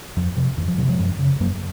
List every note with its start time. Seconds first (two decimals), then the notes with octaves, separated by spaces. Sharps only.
0.16 F2 F3
0.36 C3 F3
0.57 F2 D#3
0.68 F3
0.78 C3 D#3 F#3
0.88 F3 G#3
0.99 F#2
1.19 C#3
1.40 F#2 F#3 A#3